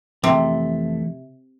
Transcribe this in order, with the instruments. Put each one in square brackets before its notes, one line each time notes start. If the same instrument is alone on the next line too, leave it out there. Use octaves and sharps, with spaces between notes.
[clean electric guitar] F2 E3 A3 [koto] C3